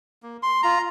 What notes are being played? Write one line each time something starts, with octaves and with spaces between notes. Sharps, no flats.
A#3
C6
F4 A#5